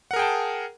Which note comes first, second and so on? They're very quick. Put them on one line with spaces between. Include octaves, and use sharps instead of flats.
F#5 A#4 G#4 G5 A5